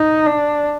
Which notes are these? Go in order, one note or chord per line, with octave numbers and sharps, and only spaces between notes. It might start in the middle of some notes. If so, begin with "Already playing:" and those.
Already playing: D#4
D4